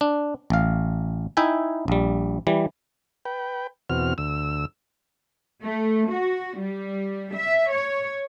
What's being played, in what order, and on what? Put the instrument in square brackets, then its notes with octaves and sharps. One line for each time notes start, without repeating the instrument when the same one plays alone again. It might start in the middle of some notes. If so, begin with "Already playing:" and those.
[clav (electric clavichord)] D4
A1 F5
D#4 E4 E5 G5 G#5
A#1 G3
E3 G3
[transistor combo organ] B4 G5
E2 B2 C4 F#4 F6
D2 E6
[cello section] A3
F#4
G3
E5
C#5